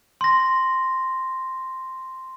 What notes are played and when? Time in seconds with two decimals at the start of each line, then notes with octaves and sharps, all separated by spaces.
0.21 C6 A#6